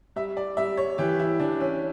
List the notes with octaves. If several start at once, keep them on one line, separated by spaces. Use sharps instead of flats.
G3 E5
D5
G3 E5
C#5
E3 G4
E4
E3 D4
C#4